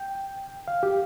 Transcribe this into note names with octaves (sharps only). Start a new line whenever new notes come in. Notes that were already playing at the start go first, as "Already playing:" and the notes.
Already playing: G5
F5
G4